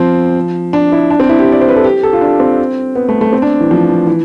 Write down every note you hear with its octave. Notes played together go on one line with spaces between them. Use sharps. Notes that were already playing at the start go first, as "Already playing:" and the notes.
Already playing: F3 C4
D4
E4
D4
C4
E4
G4
D5
C5
B4
A4
G4
A4
F4
D4
C4
B3
A3
A3
C4
D4
E3
F3
E3
E3